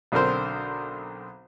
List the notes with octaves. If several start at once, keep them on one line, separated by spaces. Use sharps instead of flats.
B1 D3 C4 A#4 C5